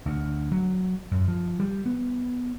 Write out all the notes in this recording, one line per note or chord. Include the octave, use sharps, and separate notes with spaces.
D2
F#3
F#2
F3
G3
B3